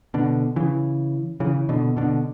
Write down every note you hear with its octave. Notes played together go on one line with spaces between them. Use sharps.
B2 D3
C#3 E3
C#3 E3
B2 D3
B2 D3